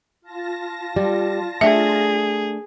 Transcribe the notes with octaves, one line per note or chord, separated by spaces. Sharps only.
F4 A5 A#6
G3
A3 D4 G#4 E5